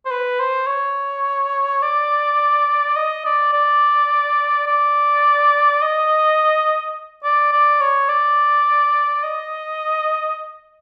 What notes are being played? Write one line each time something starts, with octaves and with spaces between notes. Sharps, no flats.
C5
B4
C5
C#5
D5
D#5
D5
D5
D5
D#5
D5
D5
C#5
D5
D#5